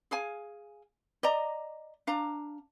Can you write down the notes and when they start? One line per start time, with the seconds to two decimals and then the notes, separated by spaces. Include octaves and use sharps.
0.11 G#4 F5 G#5
1.23 D5 D#5 A#5
2.07 D4 F5 A#5